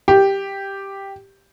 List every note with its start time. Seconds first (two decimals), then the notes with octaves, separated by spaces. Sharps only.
0.08 G4